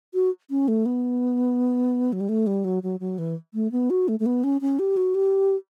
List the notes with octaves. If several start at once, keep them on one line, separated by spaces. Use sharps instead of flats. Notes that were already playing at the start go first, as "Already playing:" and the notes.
F#4
C#4
A3
B3
F#3
G3
A3
G3
F#3
F#3
F#3
E3
A3
B3
F#4
A3
A3
B3
C#4
C#4
G4
F#4
G4